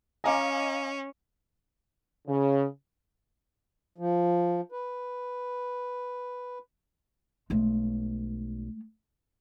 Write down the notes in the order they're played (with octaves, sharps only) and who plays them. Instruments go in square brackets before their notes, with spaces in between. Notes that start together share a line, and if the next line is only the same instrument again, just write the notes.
[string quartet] C#4 [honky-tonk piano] D#5 F5 [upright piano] G#5 A#5 D6
[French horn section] C#3
[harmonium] F3
B4
[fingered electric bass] B1 [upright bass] G#3 A3